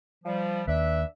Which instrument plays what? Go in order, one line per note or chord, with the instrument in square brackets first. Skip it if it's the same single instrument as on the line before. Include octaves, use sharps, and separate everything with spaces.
[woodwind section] F3 G3
[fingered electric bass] D#2 [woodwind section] D4 B4 E5